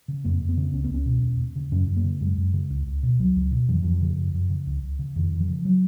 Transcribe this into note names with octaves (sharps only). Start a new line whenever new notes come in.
C#3
F2 A#3
F2
B3
C#3
C#2 C#4
B3
C#2 C#4
B2
D#2
D#2
C#3
F#2 C#4
F#2
A#3
C#3
F#2 G#3
F#2
C#3
C#2
C#2
B2
C#2 F#3
C#2
B2
F2 F3
D#3
F2 F3
F3
C#3
F#2
F#2
C#3
C#2
C#2
C#3
F2 D#3
F2
F3
C#3
F#3